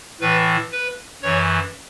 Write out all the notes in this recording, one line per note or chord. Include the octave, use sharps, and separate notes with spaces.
A2 E3 B4
B4
F#2 E3 C#5